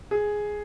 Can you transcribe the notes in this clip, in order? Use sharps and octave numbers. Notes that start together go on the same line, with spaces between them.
G#4